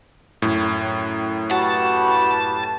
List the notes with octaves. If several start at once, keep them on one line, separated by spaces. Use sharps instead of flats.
F#2 A2
F#4 G4 B4 A5